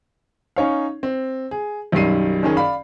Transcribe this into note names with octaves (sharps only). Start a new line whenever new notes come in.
C#4 D#4 C#5 F5
C4
G#4
B1 F#2 D#3 G3 C7 D#7
F#1 D#3 C#4 G#4
D5 F5 B5